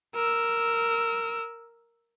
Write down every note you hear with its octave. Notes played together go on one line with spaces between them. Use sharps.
A#4 E6